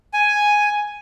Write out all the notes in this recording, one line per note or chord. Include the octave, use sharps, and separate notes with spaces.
G#5